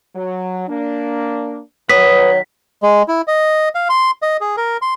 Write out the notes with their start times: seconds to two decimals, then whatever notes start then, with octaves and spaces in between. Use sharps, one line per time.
0.16 F#3
0.69 A#3 D4
1.89 D#3 F#3 B4 C#5 F#5 D#6 B6
2.83 G#3
3.08 E4
3.28 D#5
3.75 F5
3.89 C6
4.22 D#5
4.41 G#4
4.57 A#4
4.82 C6